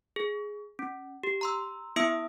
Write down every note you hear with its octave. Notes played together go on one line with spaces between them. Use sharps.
G#4
C#4
G4
A#5 C6 E6
B3 E4 E5 D#6 E6 D7